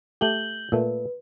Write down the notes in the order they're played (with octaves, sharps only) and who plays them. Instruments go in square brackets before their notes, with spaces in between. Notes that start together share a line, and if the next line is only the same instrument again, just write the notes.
[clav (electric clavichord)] A3 G4 [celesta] G6 F#7 G7
[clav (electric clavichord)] A#2 A3 [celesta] B4